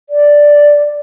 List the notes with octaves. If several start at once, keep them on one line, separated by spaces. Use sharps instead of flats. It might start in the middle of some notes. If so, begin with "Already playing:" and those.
D5